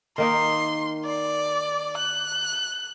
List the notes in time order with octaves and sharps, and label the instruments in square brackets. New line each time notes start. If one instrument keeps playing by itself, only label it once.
[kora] D#3 A#3 D#4 [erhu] C6
[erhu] D5
F#6